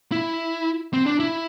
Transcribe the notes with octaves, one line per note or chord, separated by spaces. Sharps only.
E4
C4
D4
E4